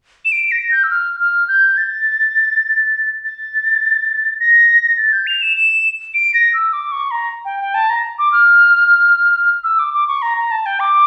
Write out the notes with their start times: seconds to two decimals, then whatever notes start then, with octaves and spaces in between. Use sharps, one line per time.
0.25 E7
0.32 D7
0.51 A#6
0.72 G6
0.84 E6
0.90 F6
1.20 F6
1.48 G6
1.77 A6
3.24 A6
4.40 A#6
4.98 A6
5.13 G6
5.27 F7
5.42 E7
5.57 E7
6.14 D7
6.34 A#6
6.54 E6
6.73 D6
6.92 C#6
7.11 A#5
7.45 G5
7.60 G5
7.74 A5
7.90 A#5
8.19 D6
8.32 F6
9.64 E6
9.79 D6
9.94 D6
10.08 C#6
10.22 A#5
10.37 A#5
10.51 A5
10.66 G5
10.80 D6